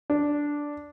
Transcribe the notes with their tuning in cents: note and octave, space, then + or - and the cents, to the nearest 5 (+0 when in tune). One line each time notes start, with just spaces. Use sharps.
D4 -5